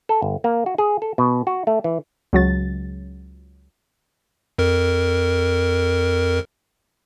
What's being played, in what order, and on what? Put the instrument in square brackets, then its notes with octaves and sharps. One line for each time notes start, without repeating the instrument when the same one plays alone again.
[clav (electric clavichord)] A4
G1
A#3
F#4
G#4
A4
B2
F#4
A3
E3
[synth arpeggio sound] C#2 F#3 A6
[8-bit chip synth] F2 A#4